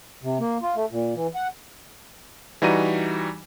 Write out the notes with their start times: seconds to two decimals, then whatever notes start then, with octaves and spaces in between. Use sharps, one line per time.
0.23 C3
0.40 A#3
0.62 F4
0.75 A3
0.91 A#2
1.15 E3
1.35 F#5
2.62 E3 G3 D#4 F#4 A#5 D#7